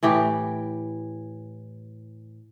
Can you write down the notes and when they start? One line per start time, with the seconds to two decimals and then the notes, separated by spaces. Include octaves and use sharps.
0.03 A2 E3 G4